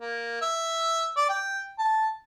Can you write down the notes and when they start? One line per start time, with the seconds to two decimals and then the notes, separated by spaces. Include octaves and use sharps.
0.01 A#3
0.41 E5
1.17 D5
1.30 G5
1.79 A5